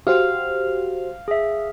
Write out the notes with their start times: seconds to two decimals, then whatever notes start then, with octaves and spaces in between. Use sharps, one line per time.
0.07 F#4 G4 C5 F5
1.28 G#4 E5